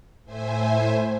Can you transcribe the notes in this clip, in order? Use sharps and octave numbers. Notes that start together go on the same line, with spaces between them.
A2 C5 E5 G#5